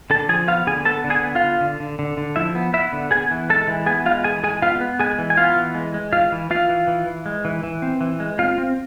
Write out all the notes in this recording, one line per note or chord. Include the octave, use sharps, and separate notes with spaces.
D3 A4 A5
F3 G#4 G#5
B3 F4 F5
D3 G#4 G#5
B3 A4 A5
D3
G#4 G#5
B3
F4 F5
D3
D3
D3
D3
D3
F3 E4 E5
B3
B3 E4 E5
D3
B3 G#4 G#5
E3
G#3 A4 A5
E3
B3 G#4 G#5
G#3 F4 F5
E3 G#4 G#5
G#3 G#4 G#5
B3 F4 F5
B3
G#3 G#4 G#5
E3
G#5
B3 F4 F5
E3
G#3
G#3
E3 F4 F5
E3
E3 F4 F5
E3
E3
E3
G#3
E3
E3
C4
E3
G#3
C4 F4 F5
C4